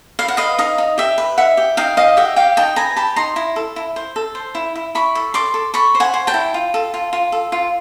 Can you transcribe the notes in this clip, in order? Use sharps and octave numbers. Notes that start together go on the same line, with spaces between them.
B4 F5
F#5
B4 D#5 F5
D#4 D#5 F5
D#4
G4 E5
B4
D#4 E5 F#5
G4
D#4 F5 G5
D#4 D#5 F5
G4 E5 F#5
G4 F5 G5
D#4 G5 A5
B4 G#5 A#5
G4 A5 B5
D#4 A#5 C6
E4
A4
E4
C5
A4
C5
E4
E4
E4 B5 C#6
A4
A4 C6 D6
A4
A4 B5 C#6
C5
F#5 G#5
C5
G5 A5
E4
F4
A4
F4
F4
A4
F4